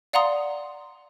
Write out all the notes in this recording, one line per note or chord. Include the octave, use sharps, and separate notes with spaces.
D5 F5 F#5 A#5 C6 D#6